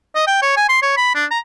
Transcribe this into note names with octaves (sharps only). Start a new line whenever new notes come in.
D#5
G5
C#5
G#5
C6
C#5
B5
D4
A#5